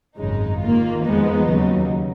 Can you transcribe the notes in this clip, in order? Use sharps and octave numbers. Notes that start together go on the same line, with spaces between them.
G#1 F#2 C#3 G#3 D#4
D#2 D#3 A#3 F4
F2 F3 G#3 B3 D#4
D#2 C#3 F#3